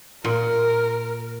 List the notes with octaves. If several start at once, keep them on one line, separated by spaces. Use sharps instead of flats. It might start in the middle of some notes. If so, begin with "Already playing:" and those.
A#2 A#4